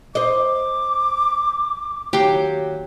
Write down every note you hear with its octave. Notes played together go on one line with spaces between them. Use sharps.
C5 D#5 D6
D#2 F#3 G4 C6